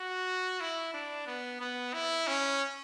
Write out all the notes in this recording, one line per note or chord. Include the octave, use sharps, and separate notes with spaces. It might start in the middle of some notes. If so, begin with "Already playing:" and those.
Already playing: F#4
E4
D4
B3
B3
E4
C#4